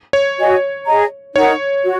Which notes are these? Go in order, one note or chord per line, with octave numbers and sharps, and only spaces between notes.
C#5
F#4 D#5 G#5
G#4 D#5 A#5
D#4 A#4 C#5 F#5
F#4